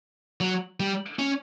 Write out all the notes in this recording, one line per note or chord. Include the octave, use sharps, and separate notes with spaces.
F#3
G3
C#4